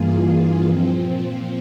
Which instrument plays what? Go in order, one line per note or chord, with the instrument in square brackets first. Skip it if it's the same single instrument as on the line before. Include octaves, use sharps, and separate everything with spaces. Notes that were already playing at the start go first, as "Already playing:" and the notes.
Already playing: [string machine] G2 E3 A#3 F4 G#4
A#2 F3 C4